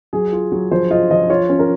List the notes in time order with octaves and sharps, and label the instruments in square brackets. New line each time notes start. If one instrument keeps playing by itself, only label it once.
[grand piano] F#3 [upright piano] G#4
[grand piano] F4
F#3
[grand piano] F3 [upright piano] C5
[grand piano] F4 [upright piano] D#5
[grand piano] F3 [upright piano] D#5
[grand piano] F4 [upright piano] C#5
[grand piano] C#4
[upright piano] A#4